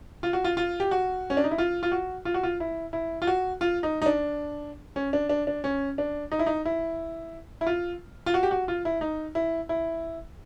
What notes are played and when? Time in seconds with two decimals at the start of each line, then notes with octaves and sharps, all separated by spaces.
0.23 F4
0.33 F#4
0.44 F4
0.57 F4
0.80 G4
0.91 F#4
1.30 C#4
1.37 D4
1.44 D#4
1.51 E4
1.58 F4
1.83 F4
1.92 F#4
2.25 F4
2.34 F#4
2.43 F4
2.60 E4
2.93 E4
3.22 F4
3.27 F#4
3.61 F4
3.83 D#4
4.02 D#4
4.06 D4
4.96 C#4
5.13 D4
5.29 D4
5.47 D4
5.64 C#4
5.98 D4
6.32 D#4
6.39 E4
6.46 D#4
6.65 E4
7.61 E4
7.67 F4
8.26 F4
8.34 F#4
8.43 G4
8.51 F#4
8.68 F4
8.85 E4
9.01 D#4
9.35 E4
9.69 E4